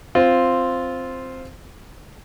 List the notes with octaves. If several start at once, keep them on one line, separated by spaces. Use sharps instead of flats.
C4 F4